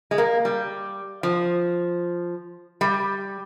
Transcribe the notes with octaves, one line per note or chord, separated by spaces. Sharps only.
G#3
A#3
G3
F3
G3